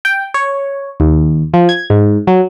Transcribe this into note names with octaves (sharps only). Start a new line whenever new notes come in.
G5
C#5
D#2
F3
G#6
G#2
F#3